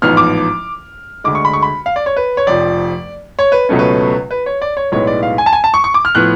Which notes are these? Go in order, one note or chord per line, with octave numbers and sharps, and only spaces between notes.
A1 G#2 F3 B3 F6
D6
D2 D3 G#3 D6
C#6
B5
C#6
B5
F5
D5
C#5
B4
C#5
F1 F2 F3 D5
C#5
B4
C#2 B2 F#3 A3 C#4
B4
B4
C#5
D5
C#5
B1 A2 G#3 B3 C#5
D5
F5
G#5
A5
G#5
A5
C#6
C#6
D6
F6
A2 F3 B3 F#6